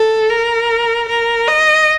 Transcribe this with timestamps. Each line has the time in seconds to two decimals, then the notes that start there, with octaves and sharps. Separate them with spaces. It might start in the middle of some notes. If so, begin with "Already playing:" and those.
Already playing: A4
0.29 A#4
1.08 A#4
1.47 D#5